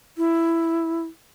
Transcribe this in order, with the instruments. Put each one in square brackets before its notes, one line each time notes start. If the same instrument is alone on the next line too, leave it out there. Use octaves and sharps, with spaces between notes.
[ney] E4